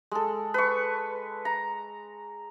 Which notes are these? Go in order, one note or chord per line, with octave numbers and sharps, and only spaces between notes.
G#3 A4
B4 C#6
A#5